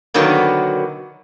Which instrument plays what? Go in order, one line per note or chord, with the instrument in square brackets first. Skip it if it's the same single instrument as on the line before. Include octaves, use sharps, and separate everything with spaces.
[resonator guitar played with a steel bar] B2 D3 D#3 F#3 A#3 B3